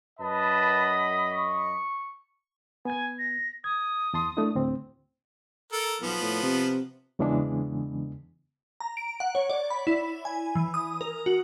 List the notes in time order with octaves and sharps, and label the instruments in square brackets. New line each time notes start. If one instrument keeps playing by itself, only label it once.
[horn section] F#2 D#5 B5 [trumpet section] B4 A5
[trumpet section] C#6
[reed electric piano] B3 G#6 [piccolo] G#5
[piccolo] A#6
[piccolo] D#6 [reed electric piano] G#6
[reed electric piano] E2 A5 C6
A3 D4 E4
D2 A2 C4
[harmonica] A4 A#4
[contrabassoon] B1 [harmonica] F3 B3
[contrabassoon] A2
C3
[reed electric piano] E2 C#3 E3 G#3 B3 D4
[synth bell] A#5
D7
F#5
C#5
D5
B5
E4
G#5
E3
D#6
A#4
F#4